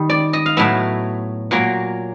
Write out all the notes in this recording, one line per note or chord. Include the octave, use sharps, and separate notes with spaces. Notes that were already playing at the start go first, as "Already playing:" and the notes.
Already playing: D#3 G3
D5
D#5
F5
A2 F#3 B3 E5
A#2 F#3 A#3